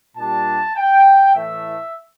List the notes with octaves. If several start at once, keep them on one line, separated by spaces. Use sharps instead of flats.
A#2 G3 D4 A5
G5
A2 E3 A3 E5